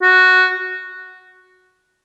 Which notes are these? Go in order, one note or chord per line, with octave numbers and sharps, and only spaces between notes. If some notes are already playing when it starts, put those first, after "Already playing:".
F#4